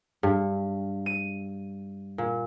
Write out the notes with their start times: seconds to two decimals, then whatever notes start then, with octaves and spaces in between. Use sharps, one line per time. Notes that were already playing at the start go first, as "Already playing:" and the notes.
0.23 G2
1.06 D#7
2.18 A#2